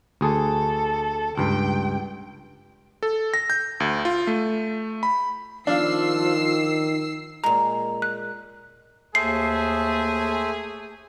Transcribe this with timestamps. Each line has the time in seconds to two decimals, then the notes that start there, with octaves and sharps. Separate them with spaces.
0.21 D2 G#4 A4
1.38 C#2 G2 G5
3.03 A4
3.34 A#6
3.50 G6
3.80 D2
4.05 F4
4.27 A3
5.03 B5
5.67 D#3 F3 D4 F5 E6 C7
7.44 A#2 G#3 A#5
8.02 F#6
9.15 D#2 A3 G#4 C5 E5 A5 C7